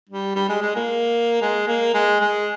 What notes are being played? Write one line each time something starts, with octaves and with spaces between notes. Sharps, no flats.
G3
G3
G#3
G#3
A#3
G#3
A#3
G#3
G#3